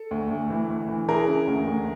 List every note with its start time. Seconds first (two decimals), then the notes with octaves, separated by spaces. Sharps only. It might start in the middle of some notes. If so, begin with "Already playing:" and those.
Already playing: A4
0.11 D2
0.31 D2
0.50 E3
0.70 D2
0.89 E3
1.08 E3 G#4 A#4
1.28 C#3
1.47 D2
1.67 D2